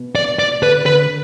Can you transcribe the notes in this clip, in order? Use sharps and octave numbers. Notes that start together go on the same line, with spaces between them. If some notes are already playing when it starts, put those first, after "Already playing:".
Already playing: B2
D5
D5
D3 B4
D3 B4